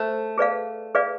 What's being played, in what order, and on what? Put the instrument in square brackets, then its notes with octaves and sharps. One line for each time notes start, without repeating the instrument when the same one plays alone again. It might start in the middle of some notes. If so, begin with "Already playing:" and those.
Already playing: [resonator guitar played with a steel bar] A3 [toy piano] C5
[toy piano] G#4 B4 D5 F5
G#4 B4 D5 F5